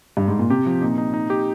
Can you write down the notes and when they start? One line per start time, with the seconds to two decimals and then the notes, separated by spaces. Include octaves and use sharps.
0.17 G2
0.28 G#2
0.39 A#2
0.50 C3 G4
0.66 F3
0.82 A#2 D#4
0.98 D#4
1.14 D#4
1.30 G4